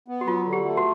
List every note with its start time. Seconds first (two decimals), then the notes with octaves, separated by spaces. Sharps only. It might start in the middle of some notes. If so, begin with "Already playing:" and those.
0.08 B3
0.21 F#4
0.27 F#3 F4
0.46 D3
0.53 G4
0.65 A3
0.77 F#4